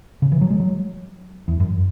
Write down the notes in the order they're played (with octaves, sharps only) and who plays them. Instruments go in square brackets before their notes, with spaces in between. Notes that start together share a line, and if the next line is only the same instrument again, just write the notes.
[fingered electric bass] C#3
E3
F#3
G#3
F#3
E2
F#2